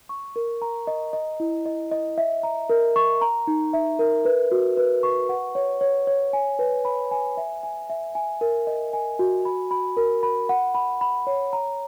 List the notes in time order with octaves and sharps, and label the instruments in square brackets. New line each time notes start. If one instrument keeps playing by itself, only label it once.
[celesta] C#6
A#4
A#5
D#5
D#5
E4
D#5
D#5
E5
A#5
A#4
C#6
A#5
D#4
E5
A#4
B4
F#4
B4
C#6
F#5
C#5
C#5
C#5
G#5
B4
B5
G#5
E5
G#5
E5
G#5
A#4
D#5
G#5
F#4
B5
B5
A#4
B5
F#5
B5
B5
C#5
A#5